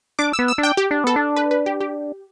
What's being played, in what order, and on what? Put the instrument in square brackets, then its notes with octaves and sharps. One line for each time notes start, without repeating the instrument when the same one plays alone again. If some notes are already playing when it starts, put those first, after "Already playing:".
[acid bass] D4 [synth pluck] D6
[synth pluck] E6
[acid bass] B3
[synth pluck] E6
[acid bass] D4
[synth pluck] G5
G4
[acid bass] D4
[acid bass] B3 [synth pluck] A4
[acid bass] D4
[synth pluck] B4
B4
G4
G4